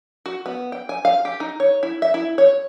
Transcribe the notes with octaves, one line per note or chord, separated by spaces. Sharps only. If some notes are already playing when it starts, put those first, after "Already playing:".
F#4
B3
G5
G#5
F5
G4
D#4
C#5
E4
E5
E4
C#5